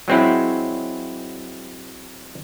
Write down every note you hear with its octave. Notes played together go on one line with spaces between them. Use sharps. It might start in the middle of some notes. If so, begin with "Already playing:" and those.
F#3 G#3 C4 C#4 E4